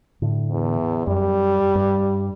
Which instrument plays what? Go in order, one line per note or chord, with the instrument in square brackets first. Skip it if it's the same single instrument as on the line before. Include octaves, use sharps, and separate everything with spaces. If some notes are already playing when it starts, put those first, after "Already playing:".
[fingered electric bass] A2 D3
[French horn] E2
[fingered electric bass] F#2 [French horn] G3
[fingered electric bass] G2